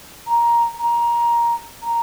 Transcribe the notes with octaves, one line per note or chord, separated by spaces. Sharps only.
A#5
A#5
A#5